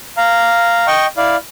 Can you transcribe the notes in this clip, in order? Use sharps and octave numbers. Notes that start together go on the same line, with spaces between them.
F5 A#5
D#5 G5 C#6
E4 D5 F5